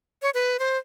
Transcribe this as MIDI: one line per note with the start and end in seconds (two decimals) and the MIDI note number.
0.22 0.30 73
0.34 0.57 71
0.59 0.78 72